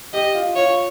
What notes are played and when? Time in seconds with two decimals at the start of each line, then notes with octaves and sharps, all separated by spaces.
0.13 G4 D#5
0.35 F4
0.55 F4 C#5